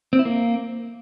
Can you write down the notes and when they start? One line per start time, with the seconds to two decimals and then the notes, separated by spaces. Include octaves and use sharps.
0.13 C4
0.19 E4
0.25 A#3